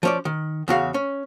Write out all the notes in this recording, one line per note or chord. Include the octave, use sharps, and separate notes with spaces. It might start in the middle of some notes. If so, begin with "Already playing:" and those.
F3 C#4 D5
D#3
E2 C#3 F#4 F5
C#4